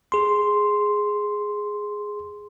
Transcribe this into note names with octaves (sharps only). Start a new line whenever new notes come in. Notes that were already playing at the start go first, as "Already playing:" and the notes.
G#4 C6